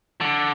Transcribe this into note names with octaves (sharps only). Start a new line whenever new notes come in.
D3